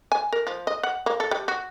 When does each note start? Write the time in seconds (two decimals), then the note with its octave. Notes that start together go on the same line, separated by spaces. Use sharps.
0.12 G#5
0.33 A#4
0.47 F3
0.67 D#5
0.83 F#5
1.06 A#3
1.20 A4
1.31 G3
1.48 F#4